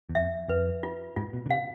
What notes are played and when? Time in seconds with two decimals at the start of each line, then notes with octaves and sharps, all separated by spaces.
0.09 E2
0.15 F2 E5
0.48 F2 B4
0.83 F4
1.16 G#2 F4
1.33 B2
1.46 D3
1.49 C3 F5